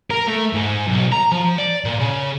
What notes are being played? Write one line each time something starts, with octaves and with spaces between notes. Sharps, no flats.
A#4
A3
G#2
B1
A#5
F3
D5
A#2
C#3